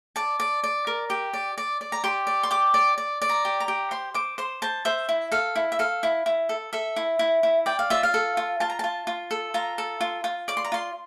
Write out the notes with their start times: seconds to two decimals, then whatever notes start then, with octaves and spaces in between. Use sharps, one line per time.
0.16 D5 A5
0.40 D5
0.64 D5
0.87 A#4
1.10 G4
1.34 D5
1.58 D5
1.81 D5
1.92 A#5
2.04 G4 C6
2.27 D5
2.43 C6
2.51 G4 D6
2.74 D5
2.98 D5
3.22 D5
3.29 A#5
3.45 G4
3.60 A#5
3.68 G4
3.91 C5 C6
4.14 C5 D6
4.38 C5 C6
4.62 C5 A5
4.85 C5 E5
5.09 E4
5.32 A4 F5
5.56 E4
5.72 E5
5.79 A4 F5
6.03 E4
6.26 E4
6.49 A4
6.73 A4 E5
6.96 E4
7.19 E4
7.43 E4
7.66 D5 G5
7.79 F5
7.90 F4 E5
8.03 F5
8.14 A4
8.37 F4
8.60 F4 A5
8.70 A#5
8.79 F4 A5
9.07 F4
9.31 A4
9.54 F4 A#5
9.78 A4
10.01 F4
10.24 F4
10.48 D5 D6
10.57 C6
10.65 A#5
10.72 F4 C6